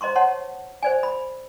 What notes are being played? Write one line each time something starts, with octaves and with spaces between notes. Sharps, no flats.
C5 D#5 A#5 C6 C#6
C#5 F#5 A5 C6
C5 D5 G#5
B5